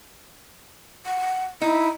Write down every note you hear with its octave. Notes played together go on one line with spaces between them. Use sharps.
F#5
D#4 E4